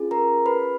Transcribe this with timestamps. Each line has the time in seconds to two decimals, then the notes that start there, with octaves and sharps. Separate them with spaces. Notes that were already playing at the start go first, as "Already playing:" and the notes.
Already playing: C#4 F4 G#4
0.11 A#4 A#5
0.46 B4 B5